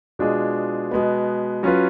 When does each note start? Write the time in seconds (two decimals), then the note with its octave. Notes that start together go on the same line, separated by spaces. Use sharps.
0.19 B2 G#3 D4 F4 G#4
0.91 B2 G#3 B3
1.63 F#3 C#4 F4 B4